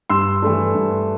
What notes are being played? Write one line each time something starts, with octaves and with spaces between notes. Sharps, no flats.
G2 C6 E6
E3 A3 D4
G2